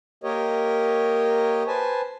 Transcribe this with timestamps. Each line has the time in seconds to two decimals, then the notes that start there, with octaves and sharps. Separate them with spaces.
0.24 A#3 G4 A#4 C#5 D#5
1.68 B4 C5 G#5 A5